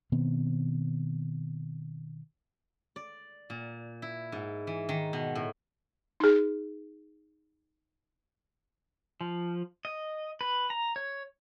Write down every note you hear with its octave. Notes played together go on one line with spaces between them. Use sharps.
B2 D#3 B3 C4
D5
A#2
E4
G#2
E3
D#3
B2
A2
D#4 G#4
F3
D#5
B4
A#5
C#5